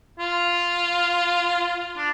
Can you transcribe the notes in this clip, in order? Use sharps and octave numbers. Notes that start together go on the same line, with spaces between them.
F4
D4